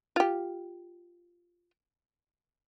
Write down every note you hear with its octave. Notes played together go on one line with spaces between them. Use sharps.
F4 G4